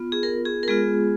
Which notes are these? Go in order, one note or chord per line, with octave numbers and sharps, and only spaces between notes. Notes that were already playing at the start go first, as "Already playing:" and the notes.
Already playing: B3 F4
G#4
A#4
G#4
A#4
G#3 B3 F4 G#4